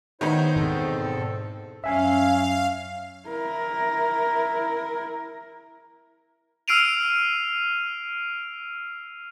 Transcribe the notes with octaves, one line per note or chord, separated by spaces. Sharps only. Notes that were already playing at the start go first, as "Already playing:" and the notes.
D#3 B3 D#4 E4 C5 C#5
E2 G#2 B2 C4 A4
F#2 C#4 E5 F5 G#5 C7
E4 A#4
E6 F6 C7 D7 D#7 F7